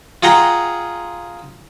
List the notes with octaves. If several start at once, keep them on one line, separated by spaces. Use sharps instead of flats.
F4 G#4 F#5 G5 A#5 C6